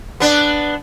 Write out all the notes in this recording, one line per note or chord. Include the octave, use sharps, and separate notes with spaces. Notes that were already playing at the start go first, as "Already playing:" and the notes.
B3 D4